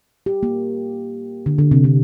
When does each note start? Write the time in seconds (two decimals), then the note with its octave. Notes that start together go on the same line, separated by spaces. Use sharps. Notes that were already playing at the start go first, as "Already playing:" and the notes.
0.26 G4
0.43 A#3
1.46 D3
1.58 D3
1.71 C3
1.84 D3